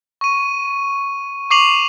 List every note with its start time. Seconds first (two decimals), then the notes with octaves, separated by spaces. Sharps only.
0.21 C#6 D#7
1.51 C#6 D6 C7 D#7 F7 F#7